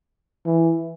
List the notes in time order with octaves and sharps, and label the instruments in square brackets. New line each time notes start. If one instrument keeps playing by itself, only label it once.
[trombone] E3